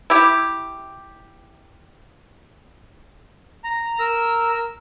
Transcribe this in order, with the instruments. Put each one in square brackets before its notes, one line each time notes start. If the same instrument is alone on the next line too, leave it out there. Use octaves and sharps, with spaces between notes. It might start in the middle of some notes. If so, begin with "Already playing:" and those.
[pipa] E4 G4
[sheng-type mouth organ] A#5
A#4 E6